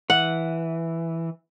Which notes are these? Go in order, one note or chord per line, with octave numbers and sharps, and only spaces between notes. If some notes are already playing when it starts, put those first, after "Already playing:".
E3 F#5